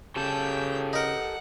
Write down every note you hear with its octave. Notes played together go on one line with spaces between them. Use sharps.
C#3 G4 A4 G5 A5 G6
D#4 A#4 F#5